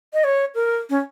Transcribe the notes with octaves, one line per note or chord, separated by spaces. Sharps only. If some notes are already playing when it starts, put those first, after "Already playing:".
D#5
C#5
A#4
C#4